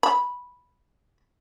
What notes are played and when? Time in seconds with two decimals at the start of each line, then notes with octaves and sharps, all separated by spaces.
0.03 B5